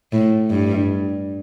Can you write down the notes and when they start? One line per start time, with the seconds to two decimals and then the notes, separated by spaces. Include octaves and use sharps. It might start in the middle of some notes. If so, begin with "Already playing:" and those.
0.13 A2
0.50 G2